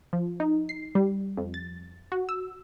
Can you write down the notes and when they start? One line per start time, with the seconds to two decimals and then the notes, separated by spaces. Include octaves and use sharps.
0.13 F3
0.40 D#4
0.69 C7
0.95 G3
1.37 F2
1.54 A6
2.12 F#4
2.29 E6